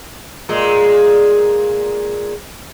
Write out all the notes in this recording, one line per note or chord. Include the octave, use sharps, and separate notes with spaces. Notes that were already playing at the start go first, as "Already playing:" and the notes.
A#2 G#3